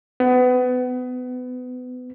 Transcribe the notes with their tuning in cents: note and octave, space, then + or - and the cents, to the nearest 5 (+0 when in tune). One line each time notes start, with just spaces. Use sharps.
B3 +30